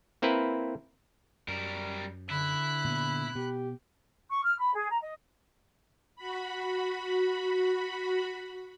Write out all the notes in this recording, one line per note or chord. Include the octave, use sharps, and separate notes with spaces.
A#3 C4 E4 A#4 B4
F#2 G3 A#4
D3 E4 B5 F#6
A#2 B3
B2 B3 G4
C#6
F6
B5
G#4
A#5
D#5
F#4 B5